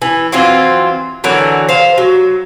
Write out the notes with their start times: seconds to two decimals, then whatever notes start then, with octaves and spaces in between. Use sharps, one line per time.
0.02 E3
0.32 E3 F#3 C4 F4
1.24 D3 E3 F#3 A#4
1.69 C5 F5
1.98 F#3